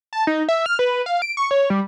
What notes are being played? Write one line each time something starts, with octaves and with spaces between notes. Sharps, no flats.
A5
D#4
E5
F6
B4
F5
D7
C#6
C#5
G3